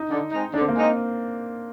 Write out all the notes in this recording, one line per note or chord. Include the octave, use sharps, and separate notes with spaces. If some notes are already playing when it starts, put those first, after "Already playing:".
Already playing: D#4
D3
G#3 C4 D#4
D3 D4
C4
A#3
G#3 C4 D#4